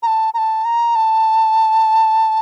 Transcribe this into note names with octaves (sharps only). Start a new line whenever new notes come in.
A#5
A5
A#5
A5
A#5
A5